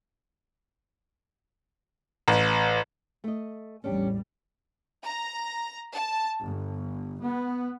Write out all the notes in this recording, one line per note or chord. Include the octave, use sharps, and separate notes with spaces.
A1
A3 D#5
A1 E2 G3 C#4 D4 G4
A#5
A5
G1
B3